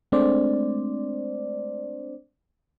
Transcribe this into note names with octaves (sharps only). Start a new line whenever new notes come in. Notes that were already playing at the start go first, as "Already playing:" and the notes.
G#3 A3 C4 D4 C5 D5